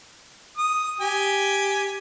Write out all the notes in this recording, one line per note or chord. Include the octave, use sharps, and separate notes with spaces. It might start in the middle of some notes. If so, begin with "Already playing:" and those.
D#6
G4 G#5